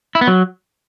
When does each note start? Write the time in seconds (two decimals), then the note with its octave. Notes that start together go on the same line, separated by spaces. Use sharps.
0.15 E4
0.21 B3
0.27 F#3